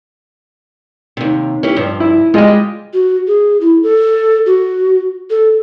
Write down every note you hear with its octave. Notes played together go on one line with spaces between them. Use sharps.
D#2 C3
C#4 E4 G4
G2 F3
E4
G3 G#3 F4 G4 D#5
F#4
G#4
E4
A4
F#4
A4